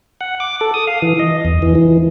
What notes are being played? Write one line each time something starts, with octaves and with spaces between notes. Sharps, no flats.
F#5
D6
A4
D#6
F5
E3
D#5
E2
E3
E3